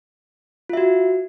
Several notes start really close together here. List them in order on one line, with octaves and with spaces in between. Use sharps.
F4 E5 F#4